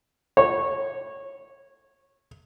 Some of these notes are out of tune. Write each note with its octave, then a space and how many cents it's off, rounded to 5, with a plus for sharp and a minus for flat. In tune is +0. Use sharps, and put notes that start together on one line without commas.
C#5 -15